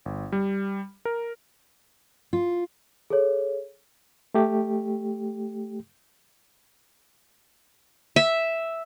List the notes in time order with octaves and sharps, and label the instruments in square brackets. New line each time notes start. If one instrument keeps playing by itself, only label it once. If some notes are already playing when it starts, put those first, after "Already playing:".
[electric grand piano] G1
G3
A#4
[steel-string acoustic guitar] F4
[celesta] G#4 A4 C#5
[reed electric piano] A3 G4
[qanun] E5